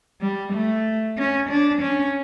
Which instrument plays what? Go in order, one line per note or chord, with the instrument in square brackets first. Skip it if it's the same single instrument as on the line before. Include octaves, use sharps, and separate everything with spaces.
[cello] G3
A3
C#4
D4
C#4